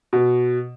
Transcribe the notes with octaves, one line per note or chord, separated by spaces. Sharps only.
B2